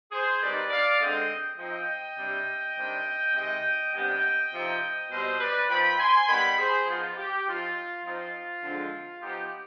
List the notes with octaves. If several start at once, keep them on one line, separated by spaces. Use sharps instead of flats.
G#4 C5
D#3 G3 C4 D#4 B4 D5
D5 F5
D3 G#3 C4 D#4 D#5 G5
F3 C4 D#4 D#5 G5
C3 G3 D4
C3 D#3 G3 D4
C3 D#3 G#3 D#5 G5
C3 G3 B3 D4 D#5 G5
C3 F3 C4 D#4
B2 G3 C4 C5 D#5
B4 D5
F3 C4 D#4 G5 B5
G#5 C6
D#3 G3 B3 G5 B5
G#4 C5
F3 B3 D#4 F4
G4
F3 C4 D#4 F4
F3 C4 D#4 F4
D3 F3 G#3 C4
F3 B3 D#4 G4